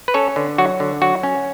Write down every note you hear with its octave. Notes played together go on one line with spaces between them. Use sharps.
B4
C#4 A4 C#5
D3
F#3 F#4
D3
F#3 F#4
C#4